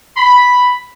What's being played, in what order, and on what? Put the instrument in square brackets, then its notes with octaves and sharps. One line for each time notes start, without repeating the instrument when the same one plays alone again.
[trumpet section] B5